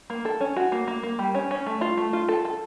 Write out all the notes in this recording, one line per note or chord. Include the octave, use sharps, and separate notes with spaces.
A#3
A4
C#4
F#4
A#3
A#3
A#3
G3
C#4
C#4
A3
F4
A3
F4
A4
A4